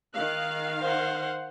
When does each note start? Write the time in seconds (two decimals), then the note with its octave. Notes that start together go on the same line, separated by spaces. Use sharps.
0.15 D#3 F5 F#6
0.82 C5 F#5